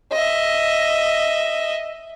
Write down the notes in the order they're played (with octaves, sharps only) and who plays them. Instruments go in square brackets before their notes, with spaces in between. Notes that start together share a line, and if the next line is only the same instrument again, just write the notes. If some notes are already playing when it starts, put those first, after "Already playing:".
[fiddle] D#5 E5